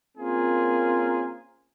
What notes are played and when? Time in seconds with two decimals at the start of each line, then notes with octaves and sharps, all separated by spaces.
0.18 A#3 C4 C#4 F4 G#4 A#4